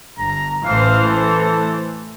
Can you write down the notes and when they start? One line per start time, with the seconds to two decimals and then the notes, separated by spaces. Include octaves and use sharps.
0.19 G1 A#5
0.65 A1 A2 E3 C5 F5
1.06 A3 A4